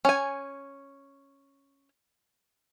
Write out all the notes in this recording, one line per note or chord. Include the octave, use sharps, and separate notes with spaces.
C#4 G#5